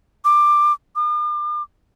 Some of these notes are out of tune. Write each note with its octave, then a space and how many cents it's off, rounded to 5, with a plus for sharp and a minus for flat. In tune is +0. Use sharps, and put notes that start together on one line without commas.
D6 +15
D6 +45